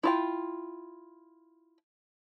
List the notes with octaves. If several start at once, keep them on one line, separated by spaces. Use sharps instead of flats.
E4 F4 G5